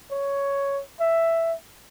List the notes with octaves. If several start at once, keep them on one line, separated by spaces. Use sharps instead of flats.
C#5
E5